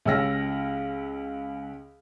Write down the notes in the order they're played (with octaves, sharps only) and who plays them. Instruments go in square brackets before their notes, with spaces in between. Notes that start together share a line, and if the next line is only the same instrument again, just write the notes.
[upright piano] C#2 C#4 G4 E6 F6 A#6